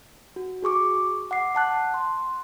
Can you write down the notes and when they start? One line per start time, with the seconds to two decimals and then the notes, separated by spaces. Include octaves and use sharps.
0.36 F#4
0.63 F#4 G#4 C#6 D6
1.31 F#5 D6 C7
1.55 F#5 A5 F#6
1.94 C6